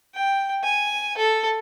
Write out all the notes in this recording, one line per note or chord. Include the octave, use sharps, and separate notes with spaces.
G5
G#5
A4